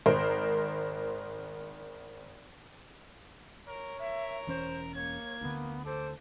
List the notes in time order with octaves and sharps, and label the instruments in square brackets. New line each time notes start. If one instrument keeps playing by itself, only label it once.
[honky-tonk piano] G#1 A#4 C5
[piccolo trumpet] A#4 [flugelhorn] C#5
[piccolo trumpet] A#4 [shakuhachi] E5
[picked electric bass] E1 E3 C#4 [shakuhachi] C5
[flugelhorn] A#3 [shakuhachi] C#5 [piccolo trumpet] G#6
[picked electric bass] D2 D3 [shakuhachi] B3
[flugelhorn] A4 [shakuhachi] C5 [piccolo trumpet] D6